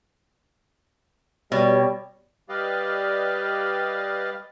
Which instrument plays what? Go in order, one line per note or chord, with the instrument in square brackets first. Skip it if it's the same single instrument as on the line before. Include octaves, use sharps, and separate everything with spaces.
[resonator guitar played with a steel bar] B2 [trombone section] G3 [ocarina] C#5
[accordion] G3 G4 B4 D5 D#5 F5